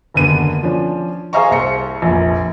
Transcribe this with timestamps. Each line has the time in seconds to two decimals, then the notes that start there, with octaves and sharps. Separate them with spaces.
0.14 F#1 D#2 D3 B3 D#7
0.63 F3 C#4 D4
1.33 G#4 C5 E5 F5 A#5 C#6
1.51 C2 C5 C#7
2.02 F1 A#1